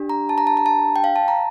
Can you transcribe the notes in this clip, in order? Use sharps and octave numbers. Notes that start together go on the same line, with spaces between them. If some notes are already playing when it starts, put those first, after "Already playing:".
Already playing: D4 G4
A#5
A5
A#5
A5
A#5
A5
G5
F5
A5
A#5